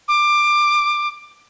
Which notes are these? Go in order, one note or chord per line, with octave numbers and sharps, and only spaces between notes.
D6